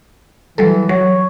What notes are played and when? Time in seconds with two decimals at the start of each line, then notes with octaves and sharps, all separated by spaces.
0.58 E3 F#3 G3 A4
0.89 F#3 C#5